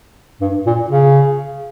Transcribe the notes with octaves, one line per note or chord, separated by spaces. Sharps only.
G2
A#2
C#3